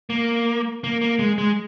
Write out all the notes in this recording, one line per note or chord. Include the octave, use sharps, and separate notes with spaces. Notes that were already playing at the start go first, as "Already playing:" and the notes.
A#3
A#3
A#3
G#3
G#3